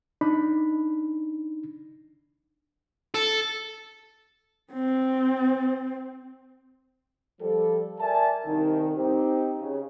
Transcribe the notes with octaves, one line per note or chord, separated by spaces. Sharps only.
D4 D#4 B5
A4
C4
F3 G3 A4
A#4 D5 E5 G#5 A5
C2 D#3
C4 D#4 G4
C#3